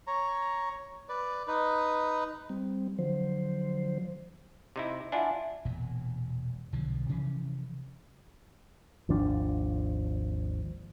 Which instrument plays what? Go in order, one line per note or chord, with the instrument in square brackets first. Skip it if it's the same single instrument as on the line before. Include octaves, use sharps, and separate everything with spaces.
[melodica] C#5 A#5
B4 D5
D#4 B4
[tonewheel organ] G3 C4
D3 F3 F#3 C5
[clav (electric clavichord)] C3 D#4 E4
[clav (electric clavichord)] D4 E4 F4 [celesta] E5 F#5 G#5
[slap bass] E1 A#2
B1 D3 F3
C3 E3 F3 C#4
[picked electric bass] G#1 D#2 F3 D4